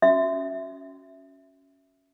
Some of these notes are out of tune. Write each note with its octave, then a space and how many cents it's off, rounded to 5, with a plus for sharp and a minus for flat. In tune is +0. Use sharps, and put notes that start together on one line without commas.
C#4 +0 F#4 +0 E5 +0